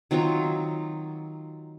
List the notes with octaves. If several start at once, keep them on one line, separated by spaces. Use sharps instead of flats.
D#3 F#3 C4 F4